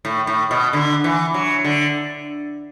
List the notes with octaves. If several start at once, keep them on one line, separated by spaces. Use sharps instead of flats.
A2
A2
B2
D3
E3
F#3
D3